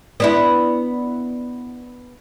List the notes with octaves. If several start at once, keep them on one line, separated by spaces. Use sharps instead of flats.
B3 D4 E4